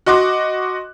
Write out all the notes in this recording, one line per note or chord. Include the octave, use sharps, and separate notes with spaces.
F#4 D#5 C6 D6 F#6